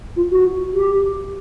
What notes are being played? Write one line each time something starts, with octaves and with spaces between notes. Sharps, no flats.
F4
F#4
G4